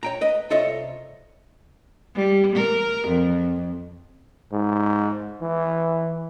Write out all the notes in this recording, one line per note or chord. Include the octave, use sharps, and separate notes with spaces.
C#5 G5 A#5
B4 D#5
C2 F4 A4 C#5 D#5 E5
G3
A#4
F2
G#2
E3